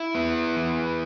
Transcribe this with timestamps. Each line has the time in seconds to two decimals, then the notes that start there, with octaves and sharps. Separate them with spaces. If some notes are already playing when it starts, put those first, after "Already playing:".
Already playing: E4
0.15 B3
0.56 E3